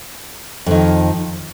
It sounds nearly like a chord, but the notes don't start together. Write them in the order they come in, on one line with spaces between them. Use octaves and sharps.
F2 D#3 F3